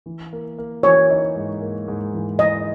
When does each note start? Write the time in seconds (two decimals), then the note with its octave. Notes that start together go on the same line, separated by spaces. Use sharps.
0.06 E3
0.33 A#3
0.58 A#3
0.83 E3 C#5
1.10 D#4
1.36 G#2
1.61 A#3
1.88 G#2
2.14 E3
2.39 E3 D#5